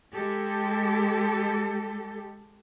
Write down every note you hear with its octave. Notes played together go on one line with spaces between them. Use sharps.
G#3 G4 A4